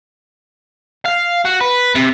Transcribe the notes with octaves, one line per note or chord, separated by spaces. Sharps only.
F5
F#4
B4
C3